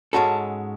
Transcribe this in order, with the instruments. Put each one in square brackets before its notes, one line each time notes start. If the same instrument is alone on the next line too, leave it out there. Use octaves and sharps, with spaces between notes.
[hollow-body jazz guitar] G#2 G#3 C#4 F#4 A4 [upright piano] A5